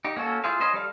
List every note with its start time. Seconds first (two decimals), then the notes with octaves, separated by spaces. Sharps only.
0.05 D#4 G4
0.16 A#3 C#4 F#4 A4
0.44 E4 F4 G#4 C5 F5
0.60 C#4 B4 C5 D#5
0.74 G3 A4 F5